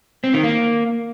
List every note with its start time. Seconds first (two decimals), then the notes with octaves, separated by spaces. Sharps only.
0.24 C4
0.34 D#3
0.43 A#3